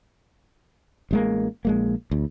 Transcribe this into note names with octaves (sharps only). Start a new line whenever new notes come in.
A1 G#3 A#3
A#1 G#3 A#3
D2